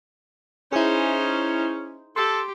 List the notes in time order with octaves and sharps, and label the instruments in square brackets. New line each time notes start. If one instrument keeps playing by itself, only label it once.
[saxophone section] C#4 [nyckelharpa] D#4 C5 [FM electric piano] E4 G#4
[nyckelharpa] G4 [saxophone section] A4 [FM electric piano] C6